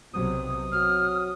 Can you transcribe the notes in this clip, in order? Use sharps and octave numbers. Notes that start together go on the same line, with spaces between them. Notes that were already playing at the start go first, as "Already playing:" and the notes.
B1 C3 F#3 D#6
C3 F#3 F6